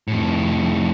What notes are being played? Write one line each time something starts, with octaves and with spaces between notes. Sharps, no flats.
F2 A2